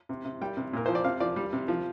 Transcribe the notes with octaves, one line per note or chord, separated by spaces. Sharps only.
C3
C3
G3 G5
C3
A#2 A#4
F3 C5
D5
C3 F5
F3 D5
G3
C3
F3